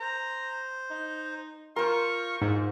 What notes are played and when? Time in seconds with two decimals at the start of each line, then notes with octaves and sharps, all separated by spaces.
0.01 C5 A#5
0.91 D#4
1.76 F4 A#4 C5 C#6
2.42 G#2 F4